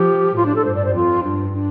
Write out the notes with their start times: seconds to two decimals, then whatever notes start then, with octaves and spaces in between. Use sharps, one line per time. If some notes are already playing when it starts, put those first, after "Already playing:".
Already playing: F3 G4
0.36 A2 F4
0.46 D4
0.55 A4
0.65 G2 C5
0.75 D5
0.85 C5
0.94 F2 F4
1.23 G2 D4
1.53 D4